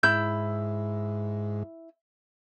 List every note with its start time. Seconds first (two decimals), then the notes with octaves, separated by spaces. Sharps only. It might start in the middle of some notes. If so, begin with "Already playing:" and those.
0.03 G#2 E4 E6 G6